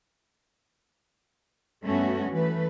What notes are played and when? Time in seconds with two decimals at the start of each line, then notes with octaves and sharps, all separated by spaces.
1.86 G2 A3 B3 C#4 F#4
2.32 E3 A3 B4